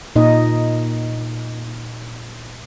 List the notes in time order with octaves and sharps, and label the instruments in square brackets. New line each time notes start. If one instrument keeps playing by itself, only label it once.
[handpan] A#2 D#4 D#5